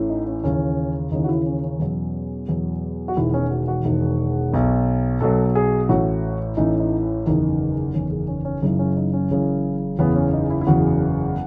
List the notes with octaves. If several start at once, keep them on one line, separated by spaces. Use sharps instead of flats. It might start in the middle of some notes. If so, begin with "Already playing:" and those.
Already playing: A1 A2 E3
D#4
C#4
D#2 C#3 E3 C#4
D#2 C#3 E3 D#4
F#4
E4
C#4
C#4
E2 B2 F#3
E2 B2 F#3
F#4
E1 E2 D#3 E4
B3
C#4
F#4
F#4
E1 E2 D#3
B1 B2 F#3
B1 B2 F#3 A4
G#4
A1 A2 E3 F#4
A1 A2 E3 D#4
D#4
E4
F#1 E2 D#3 D#4
F#1 E2 D#3 C#4
G#4
C#4
C#4
F#1 F#2 C#3 E3 D#4
C#4
D#4
C#4
F#1 F#2 C#3 E3
F#1 E2 C#3 E3 B3
C#4
D#4
E4
E4
F#1 E2 C#3 E3 F#4